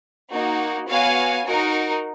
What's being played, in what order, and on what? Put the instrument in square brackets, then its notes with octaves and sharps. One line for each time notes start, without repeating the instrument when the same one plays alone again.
[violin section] A#3 D#4 F#4
B3 F#4 C#5 F5 G#5
D#4 F#4 A#4